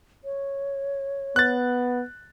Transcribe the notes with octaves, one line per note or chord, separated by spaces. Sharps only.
C#5
B3 F#6 A6